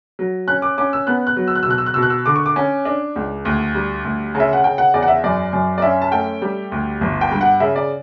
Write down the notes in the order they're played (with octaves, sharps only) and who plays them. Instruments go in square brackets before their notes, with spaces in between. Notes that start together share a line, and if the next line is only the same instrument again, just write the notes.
[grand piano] F#3
C#4 F#6
D6
C#4 D6
E6
B3 F#6
F#6
F#3
E6
F#6
E6
B2 F#6
E6
F#6
B2 E6
F#6
E6
D3 D6
C#6
D6
C#4
D4
C#2
D2
G3
D2
C#3
E5
F#5
C#3 G5
F#5
E2 D5
F#5
E5
F#2 D5
F#2
D5
C#4 E5
A5
A3 G5
G3
D2
G1
G5
G2
F#5
C#3 E5
D5